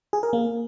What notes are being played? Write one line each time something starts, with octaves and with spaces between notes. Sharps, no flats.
G#4
A#4
A#3